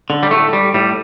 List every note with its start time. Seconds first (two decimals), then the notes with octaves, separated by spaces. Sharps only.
0.10 D3
0.23 G3
0.31 A2 A3
0.53 G3
0.74 A2 G3